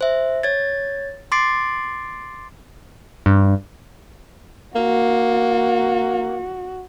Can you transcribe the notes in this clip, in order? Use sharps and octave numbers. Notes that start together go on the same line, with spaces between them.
C5 E5
C#5 G#6 A6
C6 D6 A6 C7 D7
G2
A#3 F#4